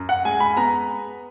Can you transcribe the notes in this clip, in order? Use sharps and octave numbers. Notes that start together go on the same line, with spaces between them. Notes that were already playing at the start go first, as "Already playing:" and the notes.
Already playing: F#2
F#5
G#3 G#5
B5
B3 A#5